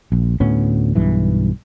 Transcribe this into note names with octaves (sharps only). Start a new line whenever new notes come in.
A#1
D2 A2 B3 C#4
B1 G2 E3